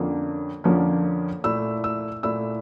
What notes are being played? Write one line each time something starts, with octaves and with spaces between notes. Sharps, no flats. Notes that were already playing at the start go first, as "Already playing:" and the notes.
Already playing: F2 D3 F3 A#3 C#4
F2 D3 F3 A#3 C#4
A#2 A3 E4 E6
E6
A#2 A3 E4 E6